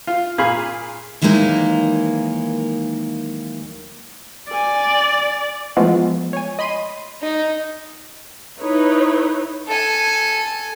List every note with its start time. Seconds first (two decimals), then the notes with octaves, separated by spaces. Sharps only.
0.07 F4
0.38 A#2 G#4 F5 B5
1.21 D#2 E3 F#3 G#3 A#3 D#4
4.52 D5 G#5
5.77 E3 F3 G#3 A3 B3 F4
6.33 C#5 G#5
6.59 D#5 B5 C6 D#7
7.22 D#4
8.59 D#4 E4 B4 C#5
9.68 A4 G#5